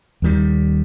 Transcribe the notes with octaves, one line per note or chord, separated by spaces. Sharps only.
D#2 D#3 G3